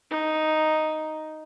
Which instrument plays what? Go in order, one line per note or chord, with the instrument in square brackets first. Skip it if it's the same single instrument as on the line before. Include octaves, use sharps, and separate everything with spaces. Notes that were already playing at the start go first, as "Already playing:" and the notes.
[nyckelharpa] D#4